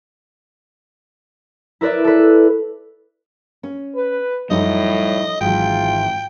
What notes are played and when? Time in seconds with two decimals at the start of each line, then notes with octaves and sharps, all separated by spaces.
1.81 E4 A#4 B4 D5 E5
2.04 A4 B4
3.63 C#4
3.95 B4
4.51 F#2 A2 F3 G3 D#4 D#5
5.41 G#1 G#2 E3 F#3 F4 G5